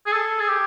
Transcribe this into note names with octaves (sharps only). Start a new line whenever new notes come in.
G#4
A4
G#4
G4